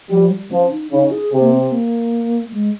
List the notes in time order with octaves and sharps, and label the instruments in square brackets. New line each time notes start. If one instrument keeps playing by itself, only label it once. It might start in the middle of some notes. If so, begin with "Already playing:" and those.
[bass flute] F3 [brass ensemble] G3
[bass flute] G3
[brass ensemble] F3 [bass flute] C#4
[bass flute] D#4
[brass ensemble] C#3 [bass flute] D#4
[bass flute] G#4
[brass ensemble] C3
[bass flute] A#3
C4
A#3
G#3